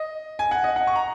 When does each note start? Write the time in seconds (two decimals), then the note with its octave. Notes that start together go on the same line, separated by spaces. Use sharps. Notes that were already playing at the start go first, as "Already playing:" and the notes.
Already playing: D#5
0.39 G#5
0.51 F#5
0.64 D#5
0.76 F#5
0.87 C#6
0.95 A#5